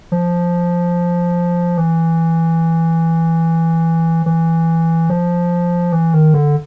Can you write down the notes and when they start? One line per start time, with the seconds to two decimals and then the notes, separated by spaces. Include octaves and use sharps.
0.12 F3
1.77 E3
4.26 E3
5.10 F3
5.92 E3
6.14 D#3
6.34 D3